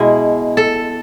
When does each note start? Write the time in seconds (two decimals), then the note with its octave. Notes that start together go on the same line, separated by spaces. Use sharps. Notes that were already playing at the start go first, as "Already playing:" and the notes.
Already playing: B2 G#3 E4
0.57 A4